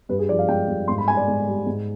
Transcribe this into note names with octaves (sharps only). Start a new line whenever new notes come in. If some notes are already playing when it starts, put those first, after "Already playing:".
G2 B4
G#4
F3 D5
F5
G#3 G5
G2
G#2 C6
B5
G3 G#5
D5
G#2
G3
G#2